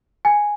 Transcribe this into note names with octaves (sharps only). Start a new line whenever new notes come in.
G#5